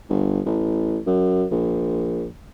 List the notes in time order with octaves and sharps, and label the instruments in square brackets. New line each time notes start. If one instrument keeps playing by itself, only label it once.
[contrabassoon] G1
A1
F#2
A#1